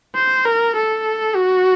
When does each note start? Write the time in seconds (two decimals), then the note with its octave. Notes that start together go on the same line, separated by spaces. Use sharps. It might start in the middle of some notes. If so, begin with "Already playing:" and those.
0.15 C5
0.45 A#4
0.76 A4
1.36 F#4